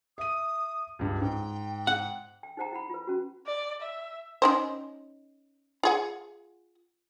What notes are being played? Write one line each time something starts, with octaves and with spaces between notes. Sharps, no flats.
E5 D#6 D#7
C#2 G2
G#2 G5
F#5
G5
D#4 G#4 C5 F#5 G5 A#5
E4 F#5 B5
F4 B4
C#4 F#4
D5
E5
C#4 D#4 C5
F4 G#4 F#5